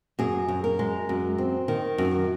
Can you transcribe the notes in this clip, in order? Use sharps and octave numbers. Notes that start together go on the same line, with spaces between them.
F#2 G#4
F#2
A#4
G#3
F#2
C4
D#3
F#2